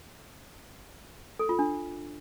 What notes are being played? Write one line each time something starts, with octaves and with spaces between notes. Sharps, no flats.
A4
F4
D4